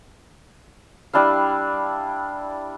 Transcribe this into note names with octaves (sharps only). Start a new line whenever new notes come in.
G3 D4 E4 F5